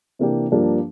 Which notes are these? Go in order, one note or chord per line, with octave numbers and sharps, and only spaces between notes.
C3 E3 A#3 D4 G4
G2 F3 A#3 D4 G4